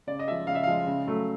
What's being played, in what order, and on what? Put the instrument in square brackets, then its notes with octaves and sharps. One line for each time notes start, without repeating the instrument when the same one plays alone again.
[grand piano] C#3 D5
D#5
F3 G#3 E5
C#3 F5
E5
F3 G#3 F5
C#3
F#3 A3